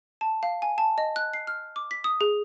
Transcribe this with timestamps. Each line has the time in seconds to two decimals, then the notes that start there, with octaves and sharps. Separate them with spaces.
0.21 A5
0.43 F5
0.62 G#5
0.78 A5
0.98 D#5
1.16 F#6
1.33 C7
1.47 F6
1.76 D6
1.91 B6
2.04 D#6
2.21 G#4